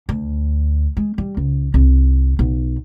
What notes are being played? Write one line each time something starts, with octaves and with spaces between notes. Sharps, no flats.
D2
G#3
G3
C#2
C2
B1